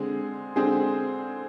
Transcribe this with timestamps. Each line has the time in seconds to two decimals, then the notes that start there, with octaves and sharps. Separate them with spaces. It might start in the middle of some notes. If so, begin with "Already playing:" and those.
Already playing: D3 G#3 C4 G#4
0.56 D3 G#3 C4 G#4 C5